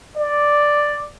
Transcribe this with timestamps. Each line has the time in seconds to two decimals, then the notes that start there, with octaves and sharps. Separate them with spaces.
0.17 D5